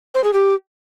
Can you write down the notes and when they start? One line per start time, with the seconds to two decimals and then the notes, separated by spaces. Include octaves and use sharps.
0.15 C5
0.24 G#4
0.33 G4